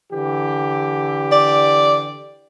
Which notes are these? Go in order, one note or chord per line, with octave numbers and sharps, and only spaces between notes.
D3 E3 G4
D5